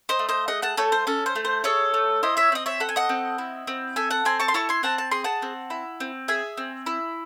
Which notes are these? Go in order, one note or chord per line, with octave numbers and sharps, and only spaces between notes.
C5 D#5
A3
C5 D#5
G#4 D#5 F#5
F#5 A5
A3 A4 C#5
C5
C#4 A4
C5
A3
C5
G#4 A4 C#5
A3
E4 C5 D#5
C#5 E5
C4 D#5
C#5 E5
A4 F#5
G#5
D#5 F#5
C4
E4
C4
A4 E5 G#5
F#5 A5
C4 G#5 C6
A5 C#6
C6
E4 A5 C#6
G#5 C6
C4 F#5 A5
A5
G#4 C6
F#5 A5
C4
E4
C4
G#4 E5 G#5
C4
E4